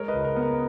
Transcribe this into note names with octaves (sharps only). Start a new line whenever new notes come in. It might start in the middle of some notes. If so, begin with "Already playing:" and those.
Already playing: G#3 A#4 C#5
B4 D#5
C#2
A#4
B3
A#4